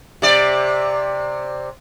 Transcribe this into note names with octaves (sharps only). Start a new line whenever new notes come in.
C3 D5